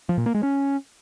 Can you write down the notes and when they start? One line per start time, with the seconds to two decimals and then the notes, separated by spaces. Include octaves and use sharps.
0.09 F3
0.18 A#2
0.26 A#3
0.35 G#3
0.43 C#4